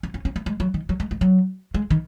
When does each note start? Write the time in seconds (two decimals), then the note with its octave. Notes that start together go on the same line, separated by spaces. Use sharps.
0.03 C#4
0.14 C#4
0.25 C#4
0.36 A#3
0.46 G#3
0.60 F#3
0.74 D#3
0.89 F#3
1.00 G#3
1.11 G#3
1.21 F#3
1.74 G#3
1.91 D#3